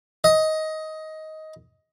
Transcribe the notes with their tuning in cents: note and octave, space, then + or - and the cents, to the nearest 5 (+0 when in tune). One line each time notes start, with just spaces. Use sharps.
D#5 +15